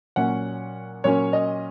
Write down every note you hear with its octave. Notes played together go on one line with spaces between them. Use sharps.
A#2 F#3 A#3 C#4 F#5
A#2 F#3 A#3 C#4 C#5
D#5